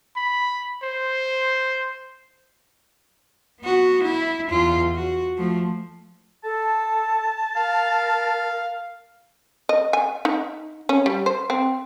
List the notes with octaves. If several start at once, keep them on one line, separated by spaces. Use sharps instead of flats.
B5
C5
B3 F#4
E4
E2 F4
F#4
F3 A3
A4 A5
A#4 F5
D#5
G#5
D#4
C#4
G3
C5
C4